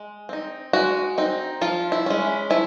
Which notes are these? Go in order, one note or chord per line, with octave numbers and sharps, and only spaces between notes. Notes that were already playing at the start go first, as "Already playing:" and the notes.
Already playing: G#3
C4 D#4
G#3 F#4
C4 D#4
F3 F4
E4
G#3 C#4
F3 E4